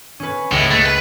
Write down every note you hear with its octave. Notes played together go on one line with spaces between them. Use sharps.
C#4 B4
C#2 A2
A3 F#6 A6
B4